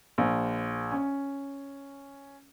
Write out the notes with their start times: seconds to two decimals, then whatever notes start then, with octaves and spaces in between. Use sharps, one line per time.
0.18 A#1
0.92 C#4